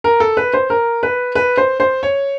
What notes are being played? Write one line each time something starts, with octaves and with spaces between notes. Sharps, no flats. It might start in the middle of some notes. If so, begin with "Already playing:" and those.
A#4
A4
B4
C5
A#4
B4
B4
C5
C5
C#5